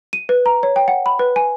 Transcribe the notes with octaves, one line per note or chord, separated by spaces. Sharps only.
D#7
B4
A#5
C#5
G5
F#5
B5
B4
G#5